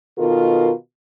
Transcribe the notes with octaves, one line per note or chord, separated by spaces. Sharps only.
B2 D#3 F4 A4 A#4